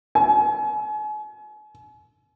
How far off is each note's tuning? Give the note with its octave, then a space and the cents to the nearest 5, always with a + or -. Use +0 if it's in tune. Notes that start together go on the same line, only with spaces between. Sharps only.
G#5 +40